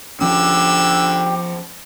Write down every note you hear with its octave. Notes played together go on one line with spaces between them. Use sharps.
D3 F3 C#4 G4 E6